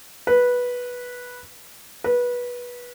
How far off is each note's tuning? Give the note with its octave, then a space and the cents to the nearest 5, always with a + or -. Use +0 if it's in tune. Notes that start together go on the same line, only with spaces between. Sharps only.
B4 -10
B4 -20